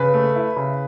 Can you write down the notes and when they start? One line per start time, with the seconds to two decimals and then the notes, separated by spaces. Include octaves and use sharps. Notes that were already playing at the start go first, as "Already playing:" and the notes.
Already playing: C#3 B4
0.14 A3
0.35 E4
0.56 C#3